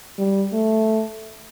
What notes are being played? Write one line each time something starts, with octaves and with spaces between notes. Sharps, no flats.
G3
A3